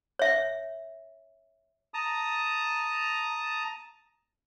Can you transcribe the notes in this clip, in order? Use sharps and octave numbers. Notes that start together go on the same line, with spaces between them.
C#5 E5
A5 A#5 D#6